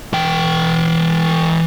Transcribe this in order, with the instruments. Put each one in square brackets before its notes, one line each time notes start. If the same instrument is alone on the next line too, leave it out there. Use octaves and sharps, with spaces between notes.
[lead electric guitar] E3 G5